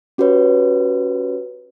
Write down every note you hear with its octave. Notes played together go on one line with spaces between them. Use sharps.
C#4 F#4 G4 B4 C#5